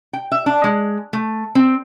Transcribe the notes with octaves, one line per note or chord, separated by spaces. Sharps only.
G5
E5
D4
G#3
A3
C4